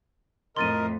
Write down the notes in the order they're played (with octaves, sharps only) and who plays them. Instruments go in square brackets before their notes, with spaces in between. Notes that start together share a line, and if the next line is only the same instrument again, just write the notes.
[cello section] F2 A2 [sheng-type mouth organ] A#4 D#5 [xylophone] C6 A6 D#7